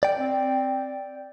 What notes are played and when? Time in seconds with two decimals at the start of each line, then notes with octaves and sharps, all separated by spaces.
0.03 D5 G5
0.18 C4